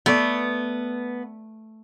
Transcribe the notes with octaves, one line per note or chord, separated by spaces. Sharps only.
A3 B3 D5